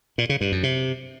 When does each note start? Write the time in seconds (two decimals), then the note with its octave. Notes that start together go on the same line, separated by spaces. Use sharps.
0.18 A#2
0.29 C#3
0.41 G2
0.52 F#2
0.63 C3